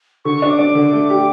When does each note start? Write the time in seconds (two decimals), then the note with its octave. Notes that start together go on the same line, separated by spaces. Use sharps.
0.25 D3 C#6
0.42 D4
0.50 D6
0.59 D4
0.75 D3
0.92 A3
1.10 G4